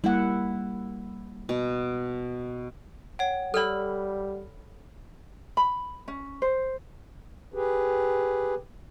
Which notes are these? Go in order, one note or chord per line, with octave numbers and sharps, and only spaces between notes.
G3 A#3 E4 F#5
B2
C#5 F#5 G5
G3 A4 D5 B5 E6 F6
B5
C#4
C5
G4 G#4 B4